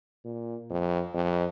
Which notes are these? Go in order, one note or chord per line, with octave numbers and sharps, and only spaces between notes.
A#2
F2
F2